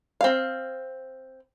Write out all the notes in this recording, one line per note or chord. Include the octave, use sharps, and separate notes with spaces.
C4 F5